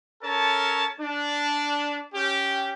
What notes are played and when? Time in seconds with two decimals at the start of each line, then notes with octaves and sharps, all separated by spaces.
0.23 C#4 A4 A#4 C#5 A5
1.01 D4
2.14 C#4 G4